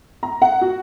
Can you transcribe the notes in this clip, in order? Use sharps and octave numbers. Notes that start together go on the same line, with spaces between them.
A#5
F#5
F#4